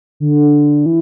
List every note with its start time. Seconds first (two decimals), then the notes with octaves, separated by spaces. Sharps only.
0.20 D3
0.86 E3